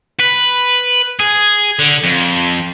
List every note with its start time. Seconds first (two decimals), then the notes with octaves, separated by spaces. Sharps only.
0.20 B4
1.20 G#4
1.79 D3
2.04 F2